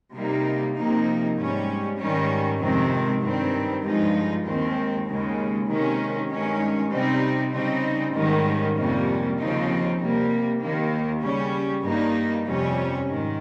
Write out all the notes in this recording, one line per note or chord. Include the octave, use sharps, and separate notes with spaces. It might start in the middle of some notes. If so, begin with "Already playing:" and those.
C3 G3 A#3 D#4
C3 F3 A#3 D#4
G#2 G3 C#4
G#2 D#3 G3 C#4
F2 C3 D#3 G#3 C4
G2 D#3 G3 C4
G2 F3 G#3 D#4
D#2 D#3 G#3 C4
D#2 C#3 G#3
C3 D#3 G#3 C#4
G2 D#3 G#3 C#4
C3 G3 C4 D#4
C#3 G3 C4 D#4
G#2 D#3 G3 C#4
F2 C3 G3 A#3 C#4
D#2 C#3 F3 C4 D#4
C3 G3 A#3
D#2 D#3 A#3
C#3 G3 C#4
G2 G3 A#3 D#4
F2 C3 G3 C#4
G#2 D#3